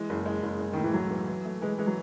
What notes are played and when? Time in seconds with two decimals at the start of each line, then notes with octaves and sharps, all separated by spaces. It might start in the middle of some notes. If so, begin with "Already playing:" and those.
Already playing: E3 G#3
0.10 F#1
0.26 G#3
0.43 F#1
0.60 G#3
0.73 A2 D#3
0.83 E3
0.94 B1 F#3
1.10 E3
1.27 E3
1.45 A3
1.61 E3 G#3
1.78 E3 G#3
1.87 F#3